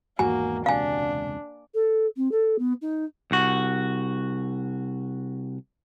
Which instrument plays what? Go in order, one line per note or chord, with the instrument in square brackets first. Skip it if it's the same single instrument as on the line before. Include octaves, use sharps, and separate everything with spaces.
[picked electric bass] G#1 E2 G#2 [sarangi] A#3 [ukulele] F#4 [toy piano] G#5
[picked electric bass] E1 C#2 C3 [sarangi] D4 [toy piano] F5 G#5
[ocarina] A4
C4
A4
B3
D#4
[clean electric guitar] C2 F#4